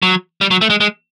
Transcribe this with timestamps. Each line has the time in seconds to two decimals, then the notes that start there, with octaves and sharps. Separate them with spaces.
0.02 F#3
0.41 G3
0.51 F#3
0.61 A3
0.70 G#3
0.81 G#3